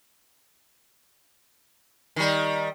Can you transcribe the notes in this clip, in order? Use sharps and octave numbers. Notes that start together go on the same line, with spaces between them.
D#3 G3